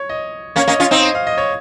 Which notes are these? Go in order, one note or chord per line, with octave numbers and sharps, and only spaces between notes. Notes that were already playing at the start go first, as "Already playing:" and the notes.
Already playing: C#5
D#5
A#3 C#4 C#5
A#3 C#4 D#5
C#4 F4
C4 D#4 C5
D#5
F5
D#5
C#5